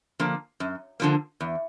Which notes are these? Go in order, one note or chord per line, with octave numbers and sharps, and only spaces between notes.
D3 F3 A#3
F#2
D3 F3 A#3
E2